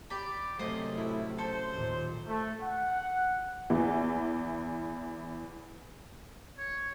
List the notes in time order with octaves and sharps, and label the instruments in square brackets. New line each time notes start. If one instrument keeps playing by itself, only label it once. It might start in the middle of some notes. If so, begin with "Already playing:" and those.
[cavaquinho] G4 D5 B5
[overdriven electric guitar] F#2 [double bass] C3 A3 [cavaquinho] C5 D#5
[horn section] A2 E4
[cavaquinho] A4 [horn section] C5
[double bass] D#2 A#2
[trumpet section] A3
F#5
[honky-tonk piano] E2 E3
[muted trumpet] C#5